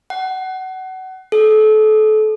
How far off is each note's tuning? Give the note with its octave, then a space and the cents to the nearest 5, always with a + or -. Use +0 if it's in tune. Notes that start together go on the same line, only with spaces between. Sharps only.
F#5 +25
A4 -30